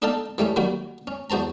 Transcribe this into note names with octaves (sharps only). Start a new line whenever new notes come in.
D4 D#4 A4 D#5 F5 A5
E3 G3 A3 C#4
D#3 F#3 G3 A#3 F#4
C#4
E2 F#4 C5 A5 A#5